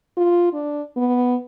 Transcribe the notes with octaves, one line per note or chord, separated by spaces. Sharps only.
F4
D4
B3